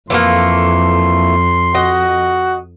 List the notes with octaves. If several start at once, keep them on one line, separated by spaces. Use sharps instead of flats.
F2 E3 A3 A#3 C6
F#4 D#5